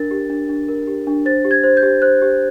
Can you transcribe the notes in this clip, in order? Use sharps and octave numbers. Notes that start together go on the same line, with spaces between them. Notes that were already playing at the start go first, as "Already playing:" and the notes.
Already playing: D4 A#4 A6
G4
D4
D4
A#4
G4
D4
C5 A6
G4
G#6
C5
G6
G4
C5 F#6
G4